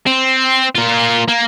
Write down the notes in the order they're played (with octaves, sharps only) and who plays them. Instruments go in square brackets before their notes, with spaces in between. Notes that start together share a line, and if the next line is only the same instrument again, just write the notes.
[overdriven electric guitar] C4
A#3 F4
A#3